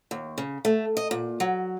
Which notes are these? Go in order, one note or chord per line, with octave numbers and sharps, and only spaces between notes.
D#2
C#3
A3
D#5
A#2
F#3